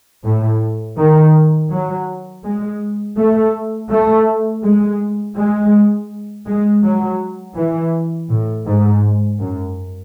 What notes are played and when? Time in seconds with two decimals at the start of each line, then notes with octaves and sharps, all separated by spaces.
0.24 A2
0.97 D#3
1.70 F#3
2.44 G#3
3.17 A3
3.90 A3
4.63 G#3
5.36 G#3
6.47 G#3
6.83 F#3
7.56 E3
8.29 A2
8.66 G#2
9.39 F#2